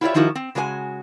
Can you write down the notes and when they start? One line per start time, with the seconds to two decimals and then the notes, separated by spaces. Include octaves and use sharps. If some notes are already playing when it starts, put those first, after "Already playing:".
0.01 E4 F4 G4 C#5 D5 E5
0.14 D#3 F3 D#4 E4 F#4 A#4
0.35 C4
0.55 C#3 G#3 F#4 C#5 G#5